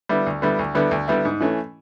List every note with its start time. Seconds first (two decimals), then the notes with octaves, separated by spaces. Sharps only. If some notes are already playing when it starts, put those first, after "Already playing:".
0.09 D3 G3 B3 E4
0.27 D2
0.42 D3 G3 B3 E4
0.59 D2
0.75 D3 G3 B3 E4
0.91 D2
1.08 D3 G3 B3 E4
1.25 G#2
1.41 E3 A3 C#4